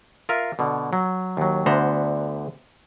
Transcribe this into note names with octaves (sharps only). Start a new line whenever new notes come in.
F4 A#4 E5 F5
B2 D3
F#3
D#2 F#3
D2 D3 B3 C5 F#5 A#5